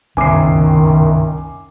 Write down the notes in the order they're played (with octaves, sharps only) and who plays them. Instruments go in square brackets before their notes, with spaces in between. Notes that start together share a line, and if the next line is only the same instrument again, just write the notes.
[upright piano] F#1 C7 [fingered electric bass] C2 G2 B2 [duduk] D#3 [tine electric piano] G#5 D6